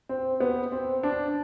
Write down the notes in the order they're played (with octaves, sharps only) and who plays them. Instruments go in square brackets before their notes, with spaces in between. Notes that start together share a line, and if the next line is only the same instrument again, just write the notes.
[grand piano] C4
B3
C4
D4